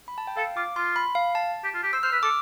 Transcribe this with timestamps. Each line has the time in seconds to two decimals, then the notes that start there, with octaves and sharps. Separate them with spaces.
0.08 B5
0.18 A5
0.27 G5
0.37 A4 F5
0.57 F4 D6
0.76 F4 C6
0.96 B5
1.15 F5
1.35 A5
1.64 G4
1.74 F4
1.83 G4
1.93 C5 E6
2.03 C5 F6
2.12 B4 E6
2.23 A4 D6